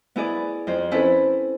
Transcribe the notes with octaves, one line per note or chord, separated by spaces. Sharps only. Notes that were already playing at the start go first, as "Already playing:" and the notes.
B3 E4 G#4 D5
F2 C5
C4 C#4 E4 A4 B4